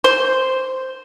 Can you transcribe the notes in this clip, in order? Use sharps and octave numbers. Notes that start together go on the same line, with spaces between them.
C5